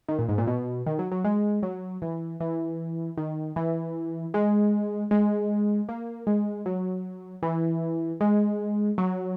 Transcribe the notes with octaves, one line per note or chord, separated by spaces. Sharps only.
D#3
A#2
G#2
A#2
B2
D#3
F#3
F#3
G#3
F#3
E3
E3
D#3
E3
G#3
G#3
A#3
G#3
F#3
E3
G#3
F#3